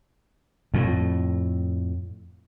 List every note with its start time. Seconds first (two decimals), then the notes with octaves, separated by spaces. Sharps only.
0.74 F2 A2